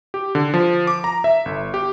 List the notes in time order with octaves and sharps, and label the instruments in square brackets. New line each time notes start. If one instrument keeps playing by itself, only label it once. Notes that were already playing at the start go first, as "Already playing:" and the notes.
[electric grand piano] G4
D3
F3
D6
A#5
E5
G1
G4